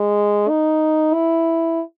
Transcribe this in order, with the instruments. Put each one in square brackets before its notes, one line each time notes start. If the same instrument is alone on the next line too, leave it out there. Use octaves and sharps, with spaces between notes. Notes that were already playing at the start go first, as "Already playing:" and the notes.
Already playing: [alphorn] G#3
D#4
E4